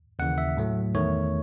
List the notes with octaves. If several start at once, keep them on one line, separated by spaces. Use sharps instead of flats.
D#2 C#3 E3 F#5
E5
A2 F#3 A3
E2 D#3 A3 C#5